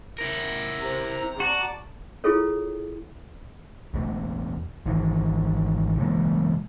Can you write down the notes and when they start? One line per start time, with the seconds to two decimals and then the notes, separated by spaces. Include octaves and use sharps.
0.18 E4 A#4
0.80 C3 A#5
1.40 F#4 D5 A5
2.24 E4 F4 G#4 A4 C#5
3.94 E2 B2 A3
4.86 G#1 D#3 E3
5.97 B2 E3 G#3 A#3